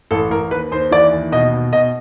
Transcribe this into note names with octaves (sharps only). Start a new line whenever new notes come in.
A1 A4
A1 A#4
D#2 B4
D#2 C5
E3 D5
D#2
B2 D#5
B2
B2 D#5